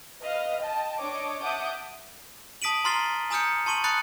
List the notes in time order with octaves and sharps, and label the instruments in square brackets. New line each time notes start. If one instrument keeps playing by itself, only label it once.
[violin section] B4 D#5 F5 F6
D#5 G5 A5
D4 C#5 D#5 D6
E5 F#5 A5 D6 D#6 G6
[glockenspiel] A5 D#6 B6 D7 D#7 F#7
A#5 C6 F6 A6 C7 G7
G#5 A#5 D#6 F6 G6 C#7
A5 C6 C#6 D#7 F#7
A5 B5 D#6 F#6 A6 C#7